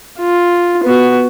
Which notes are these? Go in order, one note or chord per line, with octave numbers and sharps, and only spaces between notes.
F4
B3 F#4